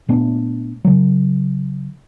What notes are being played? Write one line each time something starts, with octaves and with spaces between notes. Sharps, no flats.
A#2 A3 B3 D4
C#3 F#3